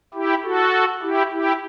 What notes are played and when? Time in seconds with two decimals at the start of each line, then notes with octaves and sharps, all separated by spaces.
0.14 E4 G4
0.43 F#4 A4
1.02 E4 G4
1.32 E4 G4